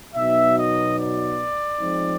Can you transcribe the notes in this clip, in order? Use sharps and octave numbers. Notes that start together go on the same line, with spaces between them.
B2 F#3 B3 D#4 E5
D#5
D5
F3 G#3 C4 D#4